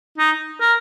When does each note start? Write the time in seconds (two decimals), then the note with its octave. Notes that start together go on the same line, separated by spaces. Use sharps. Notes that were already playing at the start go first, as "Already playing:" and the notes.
0.18 D#4
0.61 A#4